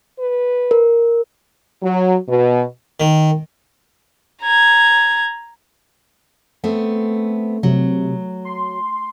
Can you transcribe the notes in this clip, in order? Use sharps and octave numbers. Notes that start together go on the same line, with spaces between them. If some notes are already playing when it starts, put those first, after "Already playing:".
B4
A#4
F#3
B2
D#3
A#5 G#6
A3 B3 C4
C3 F#3
C6